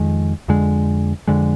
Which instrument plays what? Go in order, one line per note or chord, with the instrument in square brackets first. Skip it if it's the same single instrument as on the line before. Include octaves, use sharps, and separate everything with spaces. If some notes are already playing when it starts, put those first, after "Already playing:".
Already playing: [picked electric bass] F2 D#3 G#3
F2 D3 G#3
F2 D3 G#3